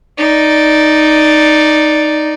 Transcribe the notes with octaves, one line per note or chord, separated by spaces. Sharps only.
D#4 D5